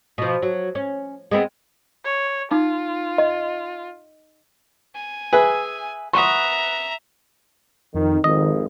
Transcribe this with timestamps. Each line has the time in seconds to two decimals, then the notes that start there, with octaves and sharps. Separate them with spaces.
0.18 B2 F3
0.42 F#3
0.75 C#4
1.31 G#3 B3 C4
2.05 C#5
2.51 D#4 F4
3.18 D#5
4.95 G#5
5.33 G#4 B4 E5
6.13 B4 E5 F#5 A#5 C6 C#6 D#6
7.94 F2 D#3
8.24 G#1 F2 D#3 D#5